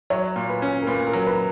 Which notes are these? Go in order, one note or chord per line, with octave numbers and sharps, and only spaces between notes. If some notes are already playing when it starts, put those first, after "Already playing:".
F#3 C#5
A#2
B4
C#4
A#4
A#2 B4
A#4
F#3
B4